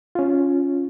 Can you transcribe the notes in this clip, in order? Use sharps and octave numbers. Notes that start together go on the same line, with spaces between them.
C#4 F4